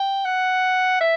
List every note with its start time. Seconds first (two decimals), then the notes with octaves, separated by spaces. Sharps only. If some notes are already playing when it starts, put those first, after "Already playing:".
Already playing: G5
0.25 F#5
1.01 E5